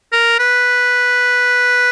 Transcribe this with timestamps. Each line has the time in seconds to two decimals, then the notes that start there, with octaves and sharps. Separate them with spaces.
0.12 A#4
0.39 B4